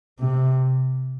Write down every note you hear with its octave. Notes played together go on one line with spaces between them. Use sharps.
C3